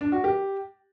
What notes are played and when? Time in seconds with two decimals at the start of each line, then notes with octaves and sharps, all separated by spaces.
0.01 D4
0.12 F#4
0.24 G4